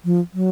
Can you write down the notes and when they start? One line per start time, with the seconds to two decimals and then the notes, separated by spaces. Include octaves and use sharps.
0.05 F3
0.34 F#3